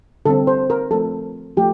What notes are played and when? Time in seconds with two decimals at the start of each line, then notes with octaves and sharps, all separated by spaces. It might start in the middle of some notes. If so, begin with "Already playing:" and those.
0.26 D3 G3 C4 A4
0.47 C5
0.70 A#4
0.91 F3 A3 C4 A4
1.57 F3 A3 G4